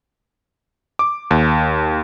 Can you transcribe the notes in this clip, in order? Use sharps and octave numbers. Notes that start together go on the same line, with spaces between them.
D6
D#2